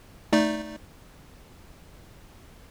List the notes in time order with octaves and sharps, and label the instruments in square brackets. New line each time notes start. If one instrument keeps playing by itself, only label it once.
[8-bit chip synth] A3 D#4 D5